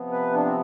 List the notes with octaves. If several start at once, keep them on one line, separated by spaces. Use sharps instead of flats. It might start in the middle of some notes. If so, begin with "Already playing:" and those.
Already playing: C3 F3 B3
B4
D4
C4